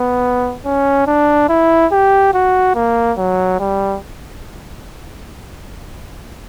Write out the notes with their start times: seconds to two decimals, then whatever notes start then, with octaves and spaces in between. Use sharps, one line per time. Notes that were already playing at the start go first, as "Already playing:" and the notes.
Already playing: B3
0.65 C#4
1.07 D4
1.49 E4
1.92 G4
2.34 F#4
2.75 A#3
3.18 F#3
3.60 G3